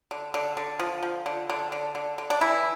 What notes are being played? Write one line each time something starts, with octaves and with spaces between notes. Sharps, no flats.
D3
D3
D3
F3
F3
D3
D3
D3
D3
D3
D4
E3 E4